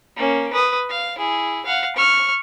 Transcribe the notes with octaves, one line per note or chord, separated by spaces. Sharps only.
A#3 C#4
B4 D#6
F5
E4 G#4
F5 F#5
C#6 F6